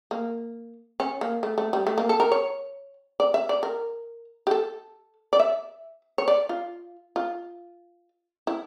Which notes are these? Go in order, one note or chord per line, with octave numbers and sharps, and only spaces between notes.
A#3
C#4
A#3
A3
A3
G3
A3
A#3
A4
A#4
C#5
D5
E5
D5
A#4
G4
A4
D5
E5
C#5
D5
F4
F4
E4